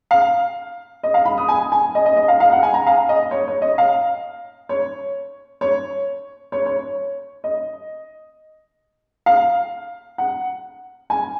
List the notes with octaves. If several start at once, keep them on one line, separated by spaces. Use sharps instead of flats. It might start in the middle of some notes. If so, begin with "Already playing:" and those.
F5
D#5
F5
B5
D#6
G#5
G#5
D#5
D#5
D#5
F5
F5
F#5
G#5
A#5
F5
D#5
C#5
C#5
D#5
F5
C#5
C#5
C#5
C#5
D#5
F5
F#5
G#5